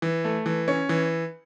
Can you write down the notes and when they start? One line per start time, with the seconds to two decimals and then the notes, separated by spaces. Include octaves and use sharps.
0.02 E3
0.24 A3
0.46 E3
0.68 C#4
0.89 E3